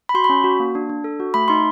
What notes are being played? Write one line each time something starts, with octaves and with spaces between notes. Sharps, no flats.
B5
F#4 C6
B5
C#4
F#4
A#3
D4
D4
A4
F#4
A3 B5
D#4 C6